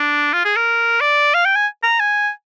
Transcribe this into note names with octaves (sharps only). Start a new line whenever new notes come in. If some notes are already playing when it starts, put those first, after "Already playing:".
Already playing: D4
F4
G#4
A#4
D5
F5
G5
G#5
A#5
G#5